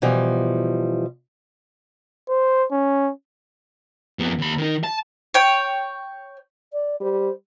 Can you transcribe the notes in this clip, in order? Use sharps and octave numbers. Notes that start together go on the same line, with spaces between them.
B2 E3 F3 G3
C5
C#4
F2 B3
D#2 B5
D#3 D#4
A5
C#5 G5
D5
G3 C5